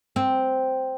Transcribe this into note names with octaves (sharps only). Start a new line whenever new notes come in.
C4